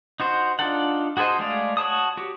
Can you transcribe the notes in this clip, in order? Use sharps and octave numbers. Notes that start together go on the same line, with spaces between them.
D#4 F#4 C5
D4 D#4 F4 A4 F#5
F#4 G#4 A4 C5 D#5
G#3 A3 G#4 D5 F5
F#4 C#5 A5 D#6
F#4 G4